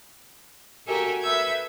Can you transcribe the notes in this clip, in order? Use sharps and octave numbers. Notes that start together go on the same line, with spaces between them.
F#4 G4 A4 A#4 E5 G#5
A4 B4 E5 E6 G6 G#6